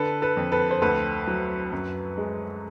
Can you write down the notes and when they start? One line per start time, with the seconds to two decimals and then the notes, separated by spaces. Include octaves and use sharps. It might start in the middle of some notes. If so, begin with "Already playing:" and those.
Already playing: D3 A4 B4
0.22 A4 B4
0.37 F2
0.52 A4 B4
0.71 C5
0.82 D2 A4 B4
1.27 F#3
1.72 F#2
2.18 G#3